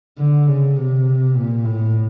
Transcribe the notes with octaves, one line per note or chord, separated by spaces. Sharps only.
D3
C#3
C3
A#2
A2